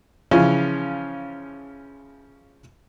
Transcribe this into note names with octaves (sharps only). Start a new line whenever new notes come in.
C#3 E3 F3 C#4